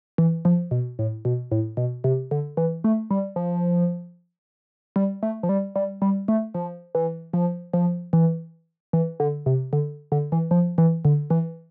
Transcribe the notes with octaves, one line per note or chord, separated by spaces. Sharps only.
E3
F3
B2
A2
B2
A2
B2
C3
D3
E3
A3
G3
F3
G3
A3
F3
G3
G3
G3
A3
F3
E3
F3
F3
E3
E3
D3
C3
D3
D3
E3
F3
E3
D3
E3